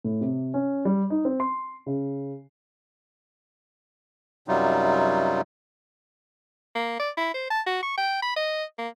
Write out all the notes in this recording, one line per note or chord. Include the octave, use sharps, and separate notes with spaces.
A2
C3
C#4
G3
D#4
C4
C6
C#3
F#2 C3 F#3 G3 D#4 F4
A#3
D5
E4
C5
A5
F#4
C#6
G5
B5
D#5
A#3